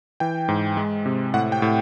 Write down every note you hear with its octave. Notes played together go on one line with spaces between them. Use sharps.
E3 G5
G#2
G#3
C3
A2 F#5
G5
A2